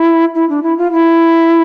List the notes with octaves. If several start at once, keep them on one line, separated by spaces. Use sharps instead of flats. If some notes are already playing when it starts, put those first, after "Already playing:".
Already playing: E4
E4
D4
E4
F4
E4